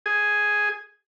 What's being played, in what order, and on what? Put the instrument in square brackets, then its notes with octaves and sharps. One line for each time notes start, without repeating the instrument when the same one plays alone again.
[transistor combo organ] G#4 G#5